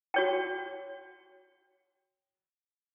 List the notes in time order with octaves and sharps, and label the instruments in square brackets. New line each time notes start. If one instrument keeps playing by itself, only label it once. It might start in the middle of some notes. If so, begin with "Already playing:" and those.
[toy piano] F#4 C#5 G5